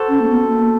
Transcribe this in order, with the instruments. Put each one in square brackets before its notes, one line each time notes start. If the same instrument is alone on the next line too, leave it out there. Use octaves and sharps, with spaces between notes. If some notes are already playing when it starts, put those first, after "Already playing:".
Already playing: [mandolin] F#4 A4 C5
[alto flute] C#4
A#3
B3
A#3